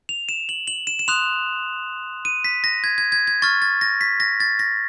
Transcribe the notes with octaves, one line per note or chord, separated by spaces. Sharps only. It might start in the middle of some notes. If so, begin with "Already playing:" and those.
F7
E7
F#7
F#7
E7
E7
C6 D#6 F#6 F7
D#7
B6
A#6
G#6
G#6
G#6
G#6
C#6 F6 A6
A6
A#6
B6
A#6
A6
A#6